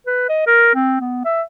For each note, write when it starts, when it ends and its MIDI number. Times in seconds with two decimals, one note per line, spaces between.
0.07 0.28 71
0.29 0.44 75
0.47 0.73 70
0.75 0.98 60
1.00 1.21 59
1.25 1.42 76